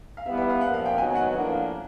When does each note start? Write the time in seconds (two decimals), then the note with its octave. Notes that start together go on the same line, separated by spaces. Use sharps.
0.17 F5
0.26 E3 G3 B3 E5
0.37 E5
0.50 F5
0.61 A#2 F3 A#3 F#5
0.74 F5
0.86 G5
0.98 G#2 D#3 F#3 B3 G#5
1.15 F#5
1.34 A2 F3 A#3 D4